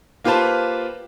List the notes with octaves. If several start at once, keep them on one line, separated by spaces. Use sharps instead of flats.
A#3 F4 G4 B4 C5 A5